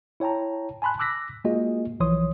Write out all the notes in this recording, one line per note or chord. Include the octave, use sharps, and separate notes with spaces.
E4 C#5 G5 A5 A#5
G#5 A5 B5 C6 F#6
D6 E6 F#6 A#6 B6
G#3 A#3 F4 F#4 G#4 D#5
B1 E3 F3 C#5 C6 D#6